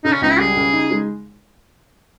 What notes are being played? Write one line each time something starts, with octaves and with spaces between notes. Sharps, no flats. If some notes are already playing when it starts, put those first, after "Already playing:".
C#3 D#4
C#4
C#2 D#4
E4
G3 G#4
C#3
D#4
G#3